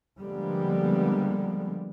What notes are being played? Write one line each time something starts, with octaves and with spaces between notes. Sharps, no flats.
D3 F3 G3 G#3 A#3 B3